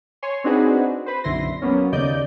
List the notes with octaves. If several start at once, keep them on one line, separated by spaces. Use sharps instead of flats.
C#5 G#5 C6
C4 D4 D#4 F#4 G#4 B4
B4 C5
B1 F#2 D3 E4 C6 A#6
F#3 A#3 B3 C#4
D#2 C#3 D5 D#5 G6